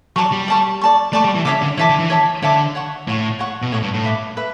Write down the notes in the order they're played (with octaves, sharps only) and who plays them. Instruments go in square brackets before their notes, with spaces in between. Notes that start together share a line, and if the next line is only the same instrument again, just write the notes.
[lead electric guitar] F#3 [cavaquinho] D5 A5 C#6
[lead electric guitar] G3
[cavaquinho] D5 A5 C#6
D5 A5 C#6
[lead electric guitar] A3 [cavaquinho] D5 A5 C#6
[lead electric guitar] G3
E3
[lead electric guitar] C#3 [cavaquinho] C#5 E5 A5 D6
[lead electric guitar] D3
[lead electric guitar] E3 [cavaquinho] C#5 E5 A5 D6
[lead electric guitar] D3
E3
[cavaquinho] C#5 E5 A5 D6
[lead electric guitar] D3 [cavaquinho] C#5 E5 A5 D6
[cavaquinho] C#5 F#5 C#6
[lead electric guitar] A2 [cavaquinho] C#5 F#5 C#6
[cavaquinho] C#5 F#5 C#6
[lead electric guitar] B2
[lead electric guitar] A2 [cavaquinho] C#5 F#5 C#6
[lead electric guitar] G2
A2
[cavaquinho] B4 E5 B5 D6
B4 E5 B5